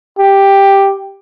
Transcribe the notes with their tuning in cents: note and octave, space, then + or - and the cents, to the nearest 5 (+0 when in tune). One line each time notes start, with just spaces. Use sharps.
G4 +5